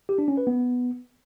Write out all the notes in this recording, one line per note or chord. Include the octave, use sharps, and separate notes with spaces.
G4
D4
C#4
B4
B3